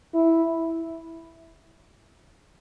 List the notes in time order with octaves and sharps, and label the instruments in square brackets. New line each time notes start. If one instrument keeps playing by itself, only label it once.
[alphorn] E4